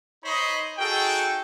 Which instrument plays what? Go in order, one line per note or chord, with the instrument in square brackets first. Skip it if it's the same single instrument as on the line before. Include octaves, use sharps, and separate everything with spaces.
[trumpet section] D#4 C5 C#5 D#5 B5 C6
D#4 F#4 G#4 A4 G5